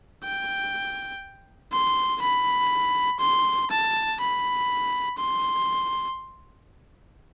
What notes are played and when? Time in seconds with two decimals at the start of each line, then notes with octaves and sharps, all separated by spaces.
0.24 G5
1.73 C6
2.22 B5
3.20 C6
3.71 A5
4.20 B5
5.18 C6